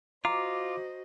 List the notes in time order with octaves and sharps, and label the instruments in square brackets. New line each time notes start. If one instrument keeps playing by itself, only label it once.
[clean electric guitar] F4 [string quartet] F#4 C5 D#5 [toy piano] A#5 [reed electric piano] D6